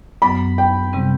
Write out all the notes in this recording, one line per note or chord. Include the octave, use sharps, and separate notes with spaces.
F#2 F#3 B3 B5
G5
C3 G3 C4